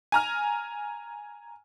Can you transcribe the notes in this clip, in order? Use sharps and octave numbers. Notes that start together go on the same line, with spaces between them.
G#5 A#5 F6